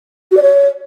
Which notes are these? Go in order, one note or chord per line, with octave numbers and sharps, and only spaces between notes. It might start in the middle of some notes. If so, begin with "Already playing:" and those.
F#4
D5
C#5